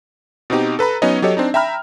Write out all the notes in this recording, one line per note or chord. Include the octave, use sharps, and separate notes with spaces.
B2 C4 D#4 G4
A4 B4 A#5 B5
F#3 B3 C#4 D#4 C#5 D#5
F#3 G4 A4 C#5 D#5
C4 D4 D#4
E5 G5 A#5 B5 F6